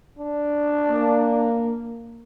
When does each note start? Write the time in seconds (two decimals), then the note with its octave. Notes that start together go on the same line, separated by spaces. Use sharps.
0.19 D4
0.90 A#3